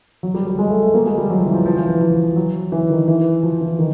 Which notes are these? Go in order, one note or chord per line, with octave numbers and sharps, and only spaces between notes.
F#3
G3
G3
G#3
A3
A3
A#3
G#3
G3
F#3
F3
E3
F3
F3
E3
E3
F3
F#3
E3
D#3
E3
F3
E3
D#3